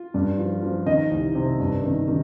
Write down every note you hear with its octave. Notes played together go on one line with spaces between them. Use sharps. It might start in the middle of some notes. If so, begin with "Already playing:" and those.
Already playing: F4
G2
F3
F3
D#3 D#5
C2
C3
G2
D#3
D#3